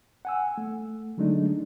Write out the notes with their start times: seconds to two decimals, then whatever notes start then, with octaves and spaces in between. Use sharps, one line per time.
0.25 F#5 G#5 E6
0.58 A3
1.17 D3 F#3 G#3 A3 D4 D#4